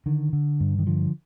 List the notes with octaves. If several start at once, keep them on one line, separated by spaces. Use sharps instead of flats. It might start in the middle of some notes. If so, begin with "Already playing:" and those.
D3 D#3
D3
G2
D#3
D3 F3